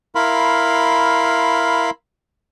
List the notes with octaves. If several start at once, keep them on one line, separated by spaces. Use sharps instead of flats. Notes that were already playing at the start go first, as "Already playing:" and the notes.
E4 A#4 F5 B5 C6